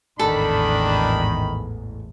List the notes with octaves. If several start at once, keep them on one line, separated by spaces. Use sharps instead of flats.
A1 E2 G#2 D#3 D4 A4 B5